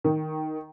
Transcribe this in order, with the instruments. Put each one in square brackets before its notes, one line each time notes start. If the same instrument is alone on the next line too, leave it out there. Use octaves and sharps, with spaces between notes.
[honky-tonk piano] D#3